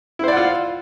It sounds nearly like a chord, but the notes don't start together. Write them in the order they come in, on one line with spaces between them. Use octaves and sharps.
E4 C5 D5 F#5 F4